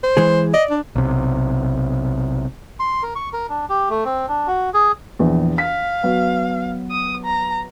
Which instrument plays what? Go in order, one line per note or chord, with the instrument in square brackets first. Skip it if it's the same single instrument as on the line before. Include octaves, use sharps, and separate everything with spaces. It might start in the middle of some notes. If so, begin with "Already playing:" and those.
[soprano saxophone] C5
[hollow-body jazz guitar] E3 G#3 G#4
[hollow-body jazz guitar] D5 [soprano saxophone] D#5
[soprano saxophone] D4
[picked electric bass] B1 C3
[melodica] C6
A#4
C#6
A#4
D4
G4
A3
C4
D4
F#4
G#4
[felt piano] A#1 E2
[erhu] F5 [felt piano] B6
[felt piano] F#3 B3
[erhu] D#6
A#5